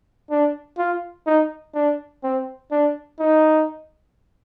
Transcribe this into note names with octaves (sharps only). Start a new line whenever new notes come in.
D4
F4
D#4
D4
C4
D4
D#4